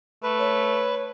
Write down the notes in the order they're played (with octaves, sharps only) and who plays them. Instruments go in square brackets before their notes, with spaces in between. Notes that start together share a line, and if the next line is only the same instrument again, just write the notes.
[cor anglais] A3 [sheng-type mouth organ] B4
[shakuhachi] C#5